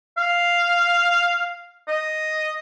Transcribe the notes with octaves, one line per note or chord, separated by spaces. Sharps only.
F5
D#5